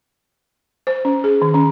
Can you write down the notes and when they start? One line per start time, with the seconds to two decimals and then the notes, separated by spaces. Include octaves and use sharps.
0.87 C5
1.05 C#4
1.24 G#4
1.42 D#3
1.54 C#4